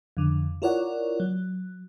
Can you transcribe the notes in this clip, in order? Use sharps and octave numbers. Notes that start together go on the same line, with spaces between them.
F2 D3
E4 F4 A#4 C#5 D5 F#5
F#3